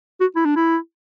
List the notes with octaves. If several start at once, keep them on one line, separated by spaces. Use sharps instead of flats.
F#4
E4
D4
E4